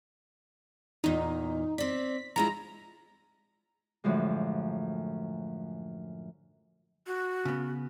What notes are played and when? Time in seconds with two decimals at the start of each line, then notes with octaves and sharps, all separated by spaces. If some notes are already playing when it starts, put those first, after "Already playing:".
1.04 E2 A#2 D#4
1.78 C4 D5 B6
2.36 F3 G#3 E4 A#5
4.04 F#2 A2 D3 F3 G#3
7.07 F#4
7.45 C#3 B3